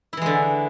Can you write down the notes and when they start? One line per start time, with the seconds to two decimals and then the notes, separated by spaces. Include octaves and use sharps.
0.13 E4
0.17 E3
0.22 G#3
0.26 D3